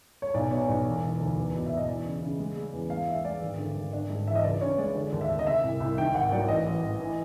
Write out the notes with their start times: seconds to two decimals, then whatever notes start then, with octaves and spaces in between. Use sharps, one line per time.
0.22 C#5
0.34 B1 D5
0.51 B2 C#5
0.68 B1 D5
0.86 E1
1.03 E1
1.20 D2
1.37 E2
1.55 B2
1.66 B2 E5
1.77 D#5
1.88 E3 D5
2.05 C#3
2.22 C#3
2.39 G#3
2.57 G#3
2.73 E2
2.90 G#3 F5
3.08 E3 E5
3.25 G#3 D5
3.42 G#1
3.58 D3
3.75 G#1
3.93 D4
4.10 G#2
4.27 E3 E5
4.36 D#5
4.44 C#2 D5
4.61 C#4 C#5
4.78 G#3 D5
4.95 D3 D5
5.12 D#2
5.21 E5
5.30 D#2
5.39 D#5
5.47 C3 E5
5.64 C2
5.80 C2
5.98 D#3 G5
6.14 G#1 F#5
6.32 F#3 D5
6.48 A1 D#5
6.66 A1
6.83 A1
7.00 E3